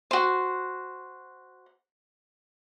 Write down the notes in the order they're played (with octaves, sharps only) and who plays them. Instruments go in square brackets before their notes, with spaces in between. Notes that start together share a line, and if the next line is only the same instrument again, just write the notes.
[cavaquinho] F#4 C5